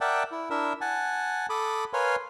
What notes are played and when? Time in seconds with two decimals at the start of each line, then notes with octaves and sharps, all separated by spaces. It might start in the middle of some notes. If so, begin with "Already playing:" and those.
0.01 A#4 D5 E5 F#5 G5 A5
0.31 E4
0.50 D4 E4 A#4 E5
0.81 F#5 G#5 A5
1.50 A4 B5 D6 D#6
1.93 A#4 B4 C#5 F5 G#5 C6